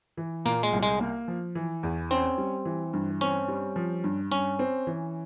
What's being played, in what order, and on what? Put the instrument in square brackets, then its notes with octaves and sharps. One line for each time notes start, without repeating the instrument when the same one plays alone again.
[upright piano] E3
[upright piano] A#2 [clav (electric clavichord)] A#3
[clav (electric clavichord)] G#3
[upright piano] C2
[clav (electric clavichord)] G#3
[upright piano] A#3
F3
E3
E2
[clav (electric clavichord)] C4 [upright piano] C#4
[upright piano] G3
E3
G2
[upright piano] C4 [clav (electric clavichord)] C#4
[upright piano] G3
F3
G2
[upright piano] G2 [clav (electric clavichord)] C#4
[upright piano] C4
E3